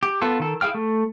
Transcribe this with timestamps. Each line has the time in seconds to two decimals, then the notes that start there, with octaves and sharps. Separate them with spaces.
0.03 G4
0.22 B3 F4 A4
0.40 D#3 A4
0.61 E4 G#4 F5 G5 F6
0.74 A3